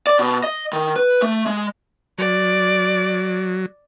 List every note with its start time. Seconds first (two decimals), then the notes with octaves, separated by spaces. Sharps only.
0.07 D5
0.19 B2
0.44 D#5
0.73 D#3
0.96 B4
1.22 A3
1.46 G#3
2.18 F#3 D5